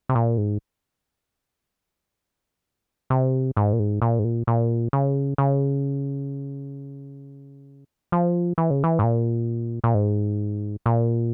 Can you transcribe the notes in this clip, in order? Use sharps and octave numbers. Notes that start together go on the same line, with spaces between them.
C3
A#2
G#2
C3
G#2
A#2
G#2
A#2
G#2
A#2
A#2
C#3
C#3
F3
E3
C#3
E3
G#2
A#2
A#2
G#2
A#2